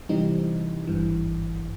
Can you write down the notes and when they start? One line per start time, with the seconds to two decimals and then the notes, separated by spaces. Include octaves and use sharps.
0.09 C3 E3 G3 C4 D#4
0.87 G#1 G2 E3